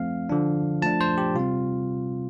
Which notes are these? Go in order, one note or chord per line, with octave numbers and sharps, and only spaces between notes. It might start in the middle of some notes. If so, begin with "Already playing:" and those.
Already playing: F3 A3 C4 F5
D3 F3 D4
F3 A3 D4 A5
C5
G4
C3 G3 C4 F4